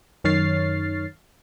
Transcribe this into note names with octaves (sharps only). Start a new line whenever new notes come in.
F#2 D#3 C#5 F6 A6 C7